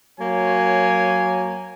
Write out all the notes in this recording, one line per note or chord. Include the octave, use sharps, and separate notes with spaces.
F#3 A#3 C#5 G#5